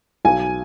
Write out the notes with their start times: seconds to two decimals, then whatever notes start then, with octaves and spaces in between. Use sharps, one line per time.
0.25 B1 G#5